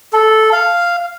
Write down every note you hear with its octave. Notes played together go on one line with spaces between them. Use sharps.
A4
F5